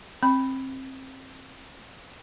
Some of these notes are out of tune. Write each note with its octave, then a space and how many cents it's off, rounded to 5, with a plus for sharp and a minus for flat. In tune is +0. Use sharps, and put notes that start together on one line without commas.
C4 +25 B5 +0